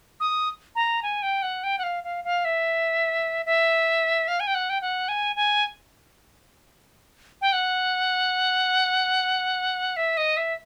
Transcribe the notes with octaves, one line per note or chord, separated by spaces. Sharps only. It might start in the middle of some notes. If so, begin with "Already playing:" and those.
D#6
A#5
G#5
G5
F#5
G5
F#5
F5
F5
F5
E5
E5
F5
G#5
G5
F#5
G5
F#5
G#5
G#5
G5
F#5
E5
D#5
E5